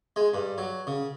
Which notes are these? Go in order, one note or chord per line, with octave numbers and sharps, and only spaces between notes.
G#3
G2
F#3
C#3